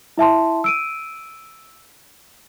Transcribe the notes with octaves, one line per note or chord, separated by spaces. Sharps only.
E4 E5 A5 C6
E6 D7 D#7